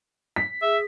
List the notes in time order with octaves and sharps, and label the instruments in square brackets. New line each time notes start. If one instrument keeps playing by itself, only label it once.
[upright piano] B6
[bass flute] G#4 [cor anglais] E5